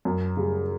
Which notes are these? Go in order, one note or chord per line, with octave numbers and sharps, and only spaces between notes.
F#2
C#3 G3